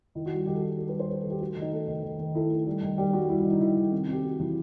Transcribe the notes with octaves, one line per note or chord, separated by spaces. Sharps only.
D#3 E4
F#4
G3
F#4
D#3 G4
A4
G3 G4
G3 A4
B4
G3
C5
G3 B4
A4
D#3
G4
A3 F#4
D#3
D#4
A3 D#4
D#3
D#3
D#3
A3 E4
A3
G3
D#3
G3 G4
G3 F#4
G3 E4
E4
D#3
D#4
D#3 E4
D#3
C3
C3 G4
C3 F#4
E3